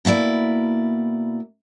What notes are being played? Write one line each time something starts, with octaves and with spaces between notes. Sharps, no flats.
B2 A#3 E4 D5